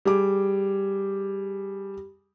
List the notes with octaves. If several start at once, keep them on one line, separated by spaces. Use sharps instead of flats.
G3 G#4 D6